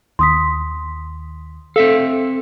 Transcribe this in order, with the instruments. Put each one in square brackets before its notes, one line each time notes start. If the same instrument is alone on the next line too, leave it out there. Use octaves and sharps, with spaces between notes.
[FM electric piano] D#2 [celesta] C6 D#6 B6
[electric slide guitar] C4 E5 F5 [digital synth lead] A4